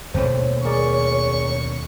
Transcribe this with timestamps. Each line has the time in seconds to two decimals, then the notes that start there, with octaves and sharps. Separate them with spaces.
0.14 D#2 B2 A3 C5 C#5
0.65 G#4 A#4 D5 C#6